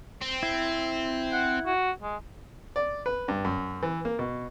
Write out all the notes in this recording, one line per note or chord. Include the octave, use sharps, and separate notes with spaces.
C4
E4
F#5
F#4
G#3
D5
B4
G2
F#2
E3
A#3
B2